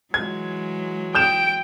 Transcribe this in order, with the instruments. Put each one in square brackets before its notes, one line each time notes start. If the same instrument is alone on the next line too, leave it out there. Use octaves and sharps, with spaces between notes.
[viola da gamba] E3 F#3 G#3 [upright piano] G#6
[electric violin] G5 D7 [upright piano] D#6 G6 E7